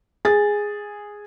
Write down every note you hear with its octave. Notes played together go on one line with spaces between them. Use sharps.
G#4 A6